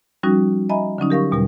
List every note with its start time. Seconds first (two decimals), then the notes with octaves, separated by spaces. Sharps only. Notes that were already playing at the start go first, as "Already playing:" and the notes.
0.23 F3 G3 C#4 D#4 F#4
0.69 D#5 E5 G#5 A#5 B5
0.98 D3 F#3 C#4 D#4
1.10 G4 A#4 F5 C#6
1.31 E2 B2 G3 A#4